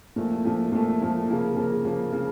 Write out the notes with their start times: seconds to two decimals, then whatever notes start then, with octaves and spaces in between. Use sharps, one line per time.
0.16 A#2 F3 A3
0.44 A#2 F3 A3
0.72 A#2 F3 A3
1.00 A#2 F3 A3
1.28 C#3 F3 A#3
1.56 C#3 F3 A#3
1.85 C#3 F3 A#3
2.12 C#3 F3